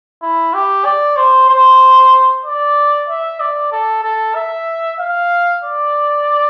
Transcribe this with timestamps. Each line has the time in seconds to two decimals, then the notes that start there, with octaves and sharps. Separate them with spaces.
0.22 E4
0.53 G4
0.85 D5
1.16 C5
1.48 C5
2.45 D5
3.08 E5
3.40 D5
3.72 A4
4.03 A4
4.35 E5
4.99 F5
5.64 D5